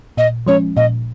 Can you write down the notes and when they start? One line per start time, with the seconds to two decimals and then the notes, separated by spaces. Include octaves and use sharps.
0.17 A#2 D#5
0.47 F3 G#3 C#4 C#5
0.76 A#2 D#5